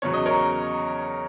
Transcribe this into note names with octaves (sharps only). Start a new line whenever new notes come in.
E2 C#3 F#3 C#5
D#5
A#4 C#5